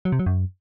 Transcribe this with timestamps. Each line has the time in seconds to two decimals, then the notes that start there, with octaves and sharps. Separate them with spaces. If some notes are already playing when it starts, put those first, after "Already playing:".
0.05 F#3
0.12 C3
0.19 F#3
0.26 F#2